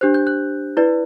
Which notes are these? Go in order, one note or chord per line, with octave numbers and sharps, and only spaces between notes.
D4 G4 C5 F#6
G6
F#6
E4 B4 D5